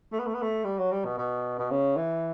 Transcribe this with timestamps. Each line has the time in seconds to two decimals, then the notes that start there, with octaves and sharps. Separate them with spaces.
0.12 A3
0.19 B3
0.27 A3
0.34 B3
0.42 A3
0.64 G3
0.78 F#3
0.91 G3
1.05 B2
1.18 B2
1.59 B2
1.71 C#3
1.97 E3